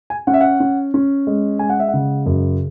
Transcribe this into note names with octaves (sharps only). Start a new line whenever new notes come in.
G#5
C#4 F#5
E5
F#5
C#4
C#4
G#3
G#3 G#5
F#5
E5
F#5
C#3
F#2